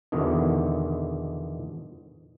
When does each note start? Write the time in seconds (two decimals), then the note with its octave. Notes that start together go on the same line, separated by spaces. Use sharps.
0.12 E2 B2 D3 D#3